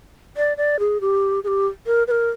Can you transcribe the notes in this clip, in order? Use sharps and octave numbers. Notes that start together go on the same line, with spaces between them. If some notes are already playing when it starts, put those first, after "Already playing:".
D5
D5
G#4
G4
G#4
G4
A#4
B4
A#4